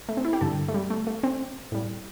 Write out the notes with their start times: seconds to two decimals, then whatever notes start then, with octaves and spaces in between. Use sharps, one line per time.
0.09 A3
0.17 C4
0.25 E4
0.33 G4
0.41 G2 D3 G3 A4
0.68 A3
0.74 G3
0.90 A3
1.07 A3
1.23 C4
1.72 A2 G3